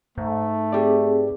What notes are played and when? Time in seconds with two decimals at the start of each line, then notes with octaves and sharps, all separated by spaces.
0.18 G#2 A3
0.73 C4 G4 G#4 B4 D5